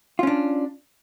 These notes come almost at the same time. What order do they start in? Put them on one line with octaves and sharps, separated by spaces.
F4 C#4 D4